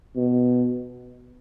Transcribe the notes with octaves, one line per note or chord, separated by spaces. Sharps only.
B2